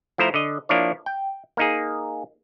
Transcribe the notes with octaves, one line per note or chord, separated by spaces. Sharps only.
F3 A3 E4 C5 A#5
D3 D#5
F3 A#3 D4 E4 C#5
G5
A#3 D#4 G#4